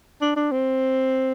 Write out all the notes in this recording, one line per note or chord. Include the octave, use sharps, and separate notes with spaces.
D4
D4
C4